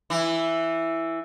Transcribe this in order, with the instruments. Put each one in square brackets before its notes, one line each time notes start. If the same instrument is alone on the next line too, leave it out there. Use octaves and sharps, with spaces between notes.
[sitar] E3 E4